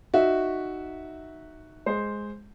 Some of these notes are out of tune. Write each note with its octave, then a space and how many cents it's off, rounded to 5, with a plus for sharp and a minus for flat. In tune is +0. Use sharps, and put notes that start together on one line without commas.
D#4 -10 F#4 +0 E5 -15
G#3 +0 C5 +0